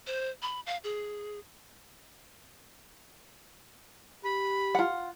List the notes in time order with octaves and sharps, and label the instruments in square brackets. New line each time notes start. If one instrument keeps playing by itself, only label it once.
[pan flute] C5
B5
F5
G#4
[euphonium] G4 [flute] B5
[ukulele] F4 F#5